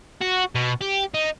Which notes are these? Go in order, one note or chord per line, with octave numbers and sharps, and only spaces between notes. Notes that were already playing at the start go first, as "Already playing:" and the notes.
F#4
B2
G4
D#4